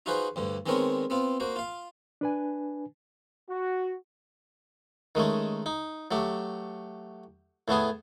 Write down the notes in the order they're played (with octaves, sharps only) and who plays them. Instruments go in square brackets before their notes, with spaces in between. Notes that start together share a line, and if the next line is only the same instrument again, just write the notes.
[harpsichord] D#4 F4 F#4 G#4 B4 C5
D2 G2 D3
D#3 G#3 B3 C4 A#4 C#5
B3 C4 F4
A#3 F#4 C5
F4 F5
[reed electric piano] D4 B4 G#5
[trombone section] F#4
[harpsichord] D#3 G#3 A3 C#4
D#4
F#3 A3 G4
A2 A3 B3 G#4